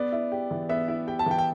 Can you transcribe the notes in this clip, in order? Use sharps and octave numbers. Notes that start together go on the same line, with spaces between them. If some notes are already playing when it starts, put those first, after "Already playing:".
Already playing: B3 D5
E4
G4
E3
B3 E5
E4
G4 G5
A5
E3 G5
G5